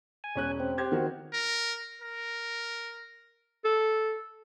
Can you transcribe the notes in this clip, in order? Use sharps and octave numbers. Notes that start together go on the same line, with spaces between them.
G#5
E1 C#4 F#6
C4
G4 C5 G#6
D#3 F#4
A#4
A#4
A4